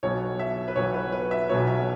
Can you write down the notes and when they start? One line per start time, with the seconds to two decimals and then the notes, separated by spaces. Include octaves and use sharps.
0.03 B1 B2 F#3 B3 C#5
0.39 E5
0.68 B4
0.76 B1 B2 F#3 B3 C#5
0.94 B4
1.12 B4
1.31 E5
1.49 B1 B2 F#3 B3 C#5
1.67 E5